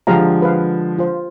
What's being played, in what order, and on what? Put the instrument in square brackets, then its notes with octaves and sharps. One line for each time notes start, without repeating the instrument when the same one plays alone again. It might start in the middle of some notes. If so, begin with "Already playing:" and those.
[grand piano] D3 F3 G#3 [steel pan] G4 F5 A#5
[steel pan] B4 C5 F5
F4 C5